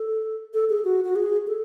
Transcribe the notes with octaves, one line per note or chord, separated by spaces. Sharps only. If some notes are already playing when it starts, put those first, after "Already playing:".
Already playing: A4
A4
G#4
F#4
F#4
G#4
A4